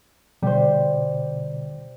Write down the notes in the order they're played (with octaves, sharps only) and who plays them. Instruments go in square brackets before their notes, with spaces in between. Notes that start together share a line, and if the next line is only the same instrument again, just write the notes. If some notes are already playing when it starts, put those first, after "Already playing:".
[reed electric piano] B2 D3 [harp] G3 C5